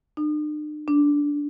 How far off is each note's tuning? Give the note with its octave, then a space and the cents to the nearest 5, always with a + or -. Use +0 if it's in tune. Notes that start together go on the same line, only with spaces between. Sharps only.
D4 +45
D4 -15